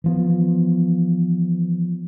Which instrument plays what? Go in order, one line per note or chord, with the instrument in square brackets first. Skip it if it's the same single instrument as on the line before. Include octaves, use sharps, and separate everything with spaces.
[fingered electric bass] E3 F3 B3